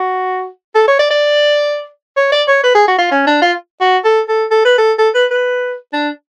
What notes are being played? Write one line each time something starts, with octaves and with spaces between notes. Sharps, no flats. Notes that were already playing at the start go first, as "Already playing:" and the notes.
Already playing: F#4
A4
C#5
D5
D5
C#5
D5
C#5
B4
G#4
F#4
F4
C#4
D4
F4
F#4
A4
A4
A4
B4
A4
A4
B4
B4
D4